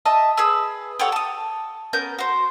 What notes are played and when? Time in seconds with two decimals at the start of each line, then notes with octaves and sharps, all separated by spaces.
0.05 D#5 E5 A5
0.37 G#4 B4 E6
0.99 G4 A4 C#5 F#5
1.12 A5 D#6
1.93 B3 C#4 A#4 G6
2.19 F#4 C5